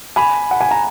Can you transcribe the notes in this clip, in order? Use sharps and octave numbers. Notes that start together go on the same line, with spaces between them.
G#5 B5
F#5
G#5
A#5